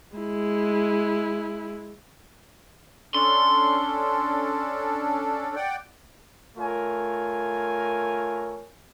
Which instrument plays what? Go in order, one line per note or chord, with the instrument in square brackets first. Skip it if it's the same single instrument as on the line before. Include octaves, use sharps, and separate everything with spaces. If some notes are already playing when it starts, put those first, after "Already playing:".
[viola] G#3 E4
[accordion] C#4 D4 A4 [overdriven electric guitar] C6
[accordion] D5 F#5 G5
[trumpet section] A3 F4 A#4 C#5 G#5